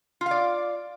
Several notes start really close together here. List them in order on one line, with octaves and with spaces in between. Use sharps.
F4 F5 D5